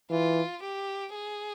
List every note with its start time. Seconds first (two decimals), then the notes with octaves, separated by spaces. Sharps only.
0.10 E3 F4
0.63 G4
1.15 G#4